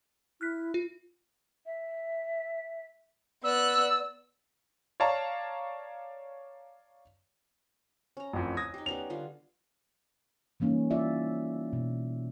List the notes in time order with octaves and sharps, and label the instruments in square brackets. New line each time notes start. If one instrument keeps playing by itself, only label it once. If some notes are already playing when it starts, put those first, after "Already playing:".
[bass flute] E4 [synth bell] F6 F#6 B6
[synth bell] F4
[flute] E5
[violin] B3 F#6 [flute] D5 [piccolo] E6
[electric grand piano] C#5 D5 F5 A5 A#5
[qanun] C#4 A#5
[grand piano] A1 F2
D#6 G#6 A#6
[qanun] D#4 G4
[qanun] G3 B3 C#4 [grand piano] F7
[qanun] D3 G3 F4
[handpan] E3 G3 A#3 C#4 D#4
E4 F4 D5 E5
B2